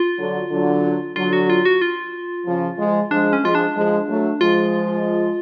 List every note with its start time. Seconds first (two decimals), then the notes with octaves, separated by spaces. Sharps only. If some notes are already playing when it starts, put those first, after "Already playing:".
Already playing: F4
0.19 D3 F#3
0.52 D3 F#3
1.16 D3 F#3 F4
1.33 F#4
1.50 F4
1.65 F#4
1.81 F4
2.46 C#3 F3
2.79 F3 G#3
3.11 F3 G#3 D4
3.33 C#4
3.43 F3 G#3 F4
3.55 D4
3.76 F3 G#3
4.09 F#3 A3
4.41 F3 G#3 F4